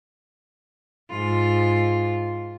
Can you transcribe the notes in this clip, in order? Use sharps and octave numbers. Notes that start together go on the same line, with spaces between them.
G#2 F4